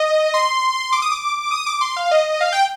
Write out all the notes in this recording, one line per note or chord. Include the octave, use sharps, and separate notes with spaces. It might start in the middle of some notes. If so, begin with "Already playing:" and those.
Already playing: D#5
C6
D6
D#6
D6
D#6
D6
C6
F5
D#5
F5
G5